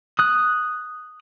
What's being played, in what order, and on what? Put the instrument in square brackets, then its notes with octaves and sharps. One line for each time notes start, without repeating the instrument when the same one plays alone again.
[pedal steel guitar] D#6 F#6